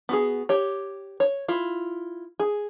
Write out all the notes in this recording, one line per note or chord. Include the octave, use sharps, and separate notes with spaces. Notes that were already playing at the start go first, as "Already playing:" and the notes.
B3 F#4 G#4
G4 C#5
C#5
E4 F4
G#4